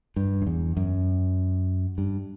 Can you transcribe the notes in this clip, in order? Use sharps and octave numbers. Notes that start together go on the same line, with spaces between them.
G2
F#2
E2
F#2
G2